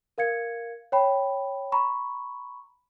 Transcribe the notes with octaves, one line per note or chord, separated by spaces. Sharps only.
A#4 F5 G#6 C#7
C#5 G5 B5
A#5 B5 C#6